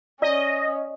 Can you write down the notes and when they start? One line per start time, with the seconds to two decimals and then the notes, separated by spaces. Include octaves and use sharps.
0.22 C#4 D5 D#5